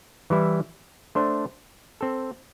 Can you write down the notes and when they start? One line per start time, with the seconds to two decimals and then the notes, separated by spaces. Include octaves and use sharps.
0.30 E3 G3 E4
1.15 A3 D4 C5
2.01 C4 A4